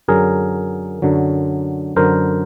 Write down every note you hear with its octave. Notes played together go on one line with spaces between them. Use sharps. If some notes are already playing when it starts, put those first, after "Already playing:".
F#2 D3 F#3 G#4 A#4
F#2 D3 F#3
F#2 D3 F#3 A#4 C5